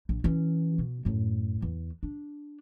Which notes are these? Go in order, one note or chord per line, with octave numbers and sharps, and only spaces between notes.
A#1
E3 C#4
B2
F#2 A2
E2
D4